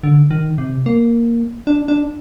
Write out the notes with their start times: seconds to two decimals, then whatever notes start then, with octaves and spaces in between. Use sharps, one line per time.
0.03 D3
0.31 D#3
0.58 C3
0.86 A#3
1.67 D4
1.88 D4